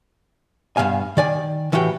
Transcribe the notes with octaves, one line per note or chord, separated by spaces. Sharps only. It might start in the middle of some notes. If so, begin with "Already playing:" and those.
G2 D#3 B3 F5 G#5
D#3 D5 G#5
A2 E3 F#4 G4 F#5 G5